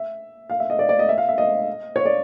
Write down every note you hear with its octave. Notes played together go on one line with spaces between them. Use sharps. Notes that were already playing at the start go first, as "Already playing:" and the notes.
Already playing: E5
F5
E5
D#5
D5
D5
D#5
E5
F5
E5
D#5
C#5
D5